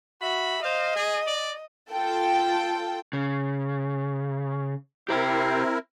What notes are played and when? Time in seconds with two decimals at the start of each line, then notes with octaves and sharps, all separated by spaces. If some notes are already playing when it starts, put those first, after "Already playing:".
0.21 F#4 E5 B5
0.63 C5 D#5 F5
0.96 G#4
1.27 D5
1.92 F4 A4 G5
3.13 C#3
5.09 C4 E4 G4 A#4 C5 G5